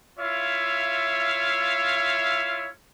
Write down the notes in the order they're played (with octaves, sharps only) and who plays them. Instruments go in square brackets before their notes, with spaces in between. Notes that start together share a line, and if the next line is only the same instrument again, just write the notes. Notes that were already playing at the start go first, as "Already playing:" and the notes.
[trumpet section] E4 F4 C#5 E5 F5